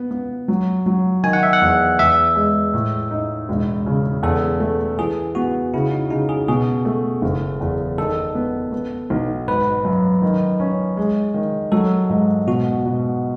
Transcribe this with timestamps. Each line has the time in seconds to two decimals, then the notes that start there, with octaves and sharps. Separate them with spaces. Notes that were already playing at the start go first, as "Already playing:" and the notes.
Already playing: B3
0.11 B3
0.48 F#3
0.86 F#3
1.23 D#3 G#5
1.33 F#5
1.43 E5
1.53 F#5
1.61 E2
1.99 E2 E5
2.35 G#3
2.74 A2
3.11 D#4
3.49 E1
3.86 C#3
4.23 E2 A4
4.60 A3
4.98 E3 G#4
5.35 B3 F#4
5.74 C#3 E4
5.91 D#4
6.10 C#3 D#4
6.29 G#4
6.48 B2 G#4
6.85 A3
7.22 F#1
7.61 E2
7.98 D#3 A4
8.35 B3
8.72 B3
9.10 B1
9.47 G#1 B4
9.85 F#2
10.22 D#3
10.60 C#4
10.97 G#3
11.34 D#3
11.72 F#3 A4
12.09 G#2
12.47 B2 F#4
12.85 B2